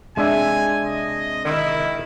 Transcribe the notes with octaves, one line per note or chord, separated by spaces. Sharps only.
C3 G#3 D4 E5 G#5
D#5
D#3 E4